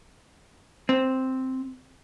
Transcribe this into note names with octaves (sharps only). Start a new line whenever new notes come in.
C4